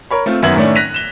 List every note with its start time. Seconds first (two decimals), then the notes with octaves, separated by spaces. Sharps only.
0.11 A#4 C#5 B5
0.26 A3 C4 F4
0.42 F#2 D#3 B3 E5 G#6 F#7
0.56 A2 D#3 A3 C#4 D4
0.75 F#6 A#6 B6 D#7 F7
0.94 E7 G7